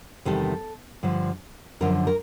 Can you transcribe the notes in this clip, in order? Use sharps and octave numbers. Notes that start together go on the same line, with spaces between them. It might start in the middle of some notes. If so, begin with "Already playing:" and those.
E2 C3 D#3 G3 A4
G2 D3 F3
F#2 D3 F3 A#4
A#4